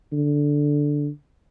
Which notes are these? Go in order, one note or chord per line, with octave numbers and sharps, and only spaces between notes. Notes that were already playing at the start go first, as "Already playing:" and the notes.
D3